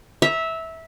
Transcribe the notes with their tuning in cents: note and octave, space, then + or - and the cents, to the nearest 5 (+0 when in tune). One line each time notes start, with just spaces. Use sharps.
E5 -15 A#5 +0